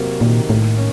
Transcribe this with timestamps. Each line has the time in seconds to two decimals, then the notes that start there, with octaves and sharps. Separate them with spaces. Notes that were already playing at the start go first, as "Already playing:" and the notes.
Already playing: C3 F#3 A#3
0.21 A#2 D#3
0.49 A2 A#3
0.78 C#4